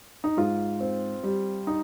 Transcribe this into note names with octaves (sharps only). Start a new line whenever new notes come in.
D#4
G#2 F4
C4
G3
D#4